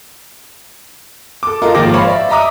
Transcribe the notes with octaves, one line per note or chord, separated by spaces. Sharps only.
A4 D6
F4 A4 A#4 D#5
G#1 F3 A#3 G5 D6 A#6
C5 C#5 F5 B5
D5 E5
D#5 E5 A#5 D6 D#6